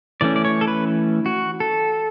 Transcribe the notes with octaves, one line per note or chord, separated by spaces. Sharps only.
E3 A3 C#4 D5
D5
C#5
A4
B4
F#4
A4